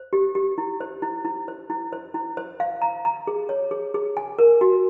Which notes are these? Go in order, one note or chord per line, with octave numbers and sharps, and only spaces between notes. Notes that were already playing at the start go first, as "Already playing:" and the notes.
Already playing: C5
G4
G4
E4
C5
E4
E4
C5
E4
C5
E4
C5
F5
A#5
A#5
G#4
C#5
G#4
G#4
G#5
A#4
F#4